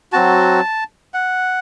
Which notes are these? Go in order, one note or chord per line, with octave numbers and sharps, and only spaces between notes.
F#3 C4 F#4 A5
F#5